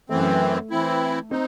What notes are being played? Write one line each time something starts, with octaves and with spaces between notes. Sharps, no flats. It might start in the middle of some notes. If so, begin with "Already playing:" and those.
F#2 E3 A3 C4
E3 C4 E4
C4 D#4